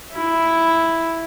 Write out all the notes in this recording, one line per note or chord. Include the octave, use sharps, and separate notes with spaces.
E4